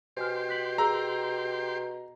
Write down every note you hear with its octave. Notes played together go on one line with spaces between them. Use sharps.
B2 G4 C5 G#5 C6 F6
F#6 B6 F#7
G#4 A#4 A#5 E6